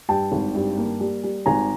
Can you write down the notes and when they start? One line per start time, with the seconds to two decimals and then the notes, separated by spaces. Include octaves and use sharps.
0.09 G2 G5 A5
0.32 G#1
0.55 G2
0.78 A#3
1.00 G3
1.24 G3
1.46 G#1 G#5 A#5